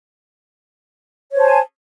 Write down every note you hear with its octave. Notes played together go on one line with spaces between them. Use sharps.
C5 C#5 G#5 A5